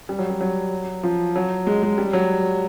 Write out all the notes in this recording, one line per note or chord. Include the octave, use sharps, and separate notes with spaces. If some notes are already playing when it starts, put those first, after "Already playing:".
G3
F#3
G3
F#3
F3
F#3
G#3
G#3
G3
F#3